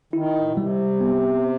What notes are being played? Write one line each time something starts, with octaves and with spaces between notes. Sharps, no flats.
D#3 E4
A2
B2
C3 G3
B3